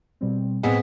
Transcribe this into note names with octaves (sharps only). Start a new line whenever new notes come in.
B2 G3 C4
A2 B3 C4 G#4 D#5 B6